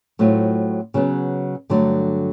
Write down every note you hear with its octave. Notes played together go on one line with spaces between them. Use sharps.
A2 F#3 A3 C4 F4
C#3 F#3 B3
G2 D3 F#3 A3